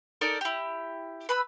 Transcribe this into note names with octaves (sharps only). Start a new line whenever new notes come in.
D#4 A4 A#4 D5
E4 G4
B4 B5 E6